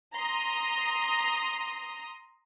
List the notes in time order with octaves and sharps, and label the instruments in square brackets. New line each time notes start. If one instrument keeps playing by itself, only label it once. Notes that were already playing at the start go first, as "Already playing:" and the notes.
[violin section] A#5 C6 D#6